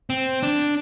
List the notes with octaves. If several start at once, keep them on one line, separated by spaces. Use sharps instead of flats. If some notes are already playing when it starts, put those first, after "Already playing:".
C4
D4